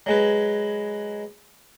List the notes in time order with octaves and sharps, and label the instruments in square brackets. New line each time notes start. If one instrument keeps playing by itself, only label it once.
[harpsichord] F#3 G#3 B4